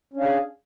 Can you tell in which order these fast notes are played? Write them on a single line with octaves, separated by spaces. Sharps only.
C#4 D4 F5 G#4